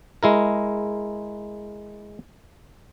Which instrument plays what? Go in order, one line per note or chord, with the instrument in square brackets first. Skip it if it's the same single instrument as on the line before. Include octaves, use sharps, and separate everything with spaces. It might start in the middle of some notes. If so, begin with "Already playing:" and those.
[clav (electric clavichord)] G#3 E4 A#4